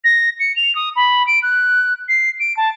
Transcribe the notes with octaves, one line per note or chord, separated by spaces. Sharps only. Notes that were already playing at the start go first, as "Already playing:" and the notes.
A#6
C#7
F7
D#6
B5
D7
F#6
C7
D7
A5